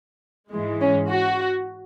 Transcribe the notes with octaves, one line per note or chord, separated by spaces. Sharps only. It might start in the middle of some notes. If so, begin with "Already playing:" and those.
G#2 E3 G#3
C#4
F#4